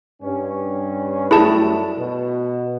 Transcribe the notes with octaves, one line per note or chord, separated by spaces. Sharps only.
G2 C#4
F#2 G3 A3 E4 G#4 A5
B2